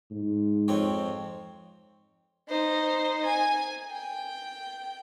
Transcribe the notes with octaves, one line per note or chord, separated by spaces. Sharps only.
G#2
F2 C4 C#5
D#4 C5
G#5
G5